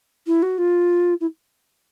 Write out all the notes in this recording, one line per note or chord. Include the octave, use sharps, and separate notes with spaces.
E4
F#4
F4
E4